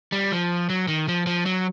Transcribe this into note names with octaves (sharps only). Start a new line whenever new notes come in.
G3
F3
F#3
D#3
F3
F3
F#3